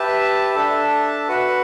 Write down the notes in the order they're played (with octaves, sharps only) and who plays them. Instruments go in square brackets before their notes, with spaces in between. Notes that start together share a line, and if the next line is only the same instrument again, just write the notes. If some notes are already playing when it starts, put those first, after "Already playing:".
Already playing: [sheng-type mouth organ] G4 B4 E5 A5
D4 A4 E5 A5
F#4 B4 F#5